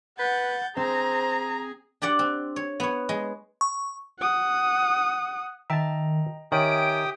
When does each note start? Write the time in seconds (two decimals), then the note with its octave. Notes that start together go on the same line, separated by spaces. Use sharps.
0.19 B4 F#5 G6 A6
0.77 C4 G#4 C5 A#5
2.02 D4 G4 D5 F#5
2.19 C4
2.56 C#5
2.80 B3 C#5
3.09 G#3
3.61 C#6
4.19 F#5 D#6
5.70 D#3 D#5 E5 G5 A5 A#5
6.52 D#3 G4 C#5 E5 G5 G#5 D#6 D7